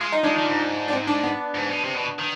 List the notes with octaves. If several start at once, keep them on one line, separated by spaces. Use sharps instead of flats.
G#3 F4
D#4
G#3 D4
D#3
G#2
D4
C4
D4
B3
G#2
B2
C3
B2
D#3